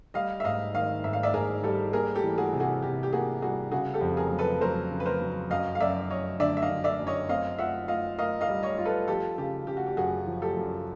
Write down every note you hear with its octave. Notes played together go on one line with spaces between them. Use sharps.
G3 D#5 F5
E5
G#2 D#5 F5
D#3 D#5 F5
G#2 E5
F5
D5 E5
G#2 G#4 A#4
G3 G4 A4
A#3 G#4 A#4
G4 A4
E3
F#4 G#4
C3
F#4 G#4
C3 G4
G4
A#3 F#4 G#4
G3 F#4 G#4
C#3 F#4 G#4
G4 A4
F2
G#4 A#4
F#3
A4 B4
F#3 A#4 C5
C#3
B4
A#4 C5
F#3
F#2 D#5 F5
F5
F#2 D5 E5
F#2 C#5 D#5
D3 D5 E5
E5
D#5 F5
D3
D5 E5
F#2
C#5 D#5
C4 D#5 F5
F4 E5 F#5
F4 D#5 F5
A#4 D#5 F5
D#5 F5
G3
C#5 D#5
F4
A4 B4
F3 G4 A4
C#3 G4
C#3 G4
F#4
G4
F#2 F#4 G#4
F3
G4 A4
F#2